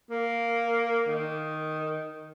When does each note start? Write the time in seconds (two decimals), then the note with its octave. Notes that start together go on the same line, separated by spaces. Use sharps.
0.10 A#3
1.08 D#3